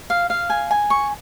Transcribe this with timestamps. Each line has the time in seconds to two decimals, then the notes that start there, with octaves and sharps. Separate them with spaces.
0.10 F5
0.30 F5
0.50 G#5
0.71 G#5
0.90 C#6